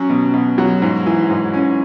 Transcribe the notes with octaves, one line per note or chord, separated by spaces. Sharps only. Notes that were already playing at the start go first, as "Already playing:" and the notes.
Already playing: F#3 C#4
B2
B2
F#3
G#2
E3
G#2
C#4